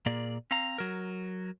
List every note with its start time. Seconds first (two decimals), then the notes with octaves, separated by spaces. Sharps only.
0.06 A#2 A#3 G#4 D5
0.51 C4 F5 A#5
0.78 F#3 A#4